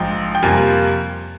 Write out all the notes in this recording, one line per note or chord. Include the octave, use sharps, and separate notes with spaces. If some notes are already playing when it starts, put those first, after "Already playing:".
Already playing: A#1 G#2 F3 G5
G5
F2 C3 G3 A#3 F4 G#5